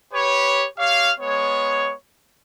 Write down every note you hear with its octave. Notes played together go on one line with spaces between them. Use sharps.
G4 B4 C#5
G4 C#5 F5
G#3 B3 C#5